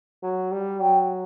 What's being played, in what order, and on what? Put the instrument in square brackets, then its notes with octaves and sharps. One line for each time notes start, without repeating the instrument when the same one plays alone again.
[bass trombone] F#3
G3
[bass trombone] F#3 [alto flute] G5